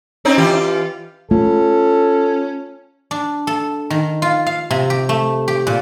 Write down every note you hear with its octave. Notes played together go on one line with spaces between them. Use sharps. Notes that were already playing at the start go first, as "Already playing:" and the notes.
C4 C#4 D#4
E3 F4 G4
A3 C#4 F4 A4
D4
A4
D#3
F4
F5
C3
G4
A3
G4
A#2